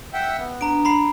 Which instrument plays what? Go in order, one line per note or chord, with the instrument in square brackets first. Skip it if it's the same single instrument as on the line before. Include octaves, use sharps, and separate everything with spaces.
[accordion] E5 F#5 G5
B3
[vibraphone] D4 [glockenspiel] A#5 D7
[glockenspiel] A#5 B5 C7